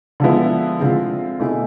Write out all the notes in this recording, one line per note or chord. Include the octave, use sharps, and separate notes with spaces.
D3 F3 G#3 B3 E4
D3 G#3 C4 F4
B2 A3 E4 G#4